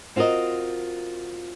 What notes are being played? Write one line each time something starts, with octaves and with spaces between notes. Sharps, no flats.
C4 F4 F#4 A#4 D#5